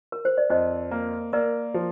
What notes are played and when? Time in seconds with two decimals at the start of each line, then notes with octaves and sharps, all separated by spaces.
0.12 A#4
0.25 C5
0.38 D5
0.50 F2 C5 D#5
0.91 A#3
1.33 A#3 A#4 D5
1.74 F3